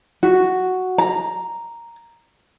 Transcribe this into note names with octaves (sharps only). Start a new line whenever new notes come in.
F#4
A#5